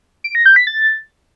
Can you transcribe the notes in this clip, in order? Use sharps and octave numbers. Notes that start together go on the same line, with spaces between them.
D7
A#6
G6
B6
A6